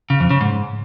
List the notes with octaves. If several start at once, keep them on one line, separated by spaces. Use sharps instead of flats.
C#3
F2
C#3
G#2